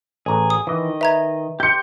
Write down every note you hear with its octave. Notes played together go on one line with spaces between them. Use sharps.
A1 G#4 A#5
D#6
D#3 E3 D#5
B4 E5 A#5 G#6
G4 C6 G6 C#7